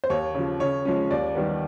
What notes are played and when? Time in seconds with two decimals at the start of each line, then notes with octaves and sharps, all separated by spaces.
0.04 C5
0.10 D#2 C#5
0.35 C#3 F3
0.60 C#3 C#5
0.85 F3 G#3 C#4
1.11 D#2 D5
1.35 D#3 G3 B3